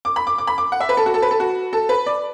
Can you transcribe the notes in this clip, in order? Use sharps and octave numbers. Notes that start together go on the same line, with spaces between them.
D6
B5
D6
D6
B5
D6
F#5
E5
B4
A4
F#4
A4
B4
A4
F#4
A4
B4
D5